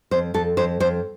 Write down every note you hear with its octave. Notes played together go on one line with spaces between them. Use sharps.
F2 C5
F2 A4
F2 C5
F2 C5